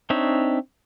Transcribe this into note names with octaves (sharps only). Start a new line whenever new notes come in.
C4 D4 D#4 C#5 E5